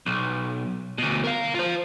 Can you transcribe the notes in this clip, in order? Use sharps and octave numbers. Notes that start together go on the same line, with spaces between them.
B1
D2 B2
A#4 F5
F4 C5